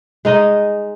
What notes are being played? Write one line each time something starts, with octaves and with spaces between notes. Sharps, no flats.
G#3 D#4 D#5